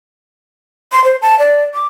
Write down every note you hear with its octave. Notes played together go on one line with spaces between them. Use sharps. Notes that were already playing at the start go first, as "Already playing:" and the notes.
C6
C5
A5
D5
D6